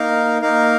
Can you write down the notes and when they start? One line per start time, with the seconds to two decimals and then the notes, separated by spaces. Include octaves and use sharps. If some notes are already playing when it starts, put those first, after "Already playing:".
Already playing: A#3 D#4 A#4 F5
0.42 A#3 D#4 A#4 F5